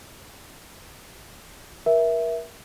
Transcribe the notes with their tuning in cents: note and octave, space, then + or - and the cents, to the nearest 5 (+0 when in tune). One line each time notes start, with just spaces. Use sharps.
A#4 +35 E5 +0